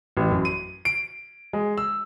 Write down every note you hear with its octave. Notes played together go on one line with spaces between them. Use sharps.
A1
F#2
D#7
D7
G#3
E6